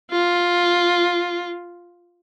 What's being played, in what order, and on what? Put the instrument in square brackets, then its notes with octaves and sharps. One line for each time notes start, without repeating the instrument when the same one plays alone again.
[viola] F4